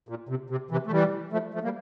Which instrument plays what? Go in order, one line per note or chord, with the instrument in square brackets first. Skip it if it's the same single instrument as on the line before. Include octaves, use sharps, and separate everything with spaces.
[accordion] A#2
C3
C3
C3 E3
A3
E3 G3
F3 A3
F3 A3
G3 A#3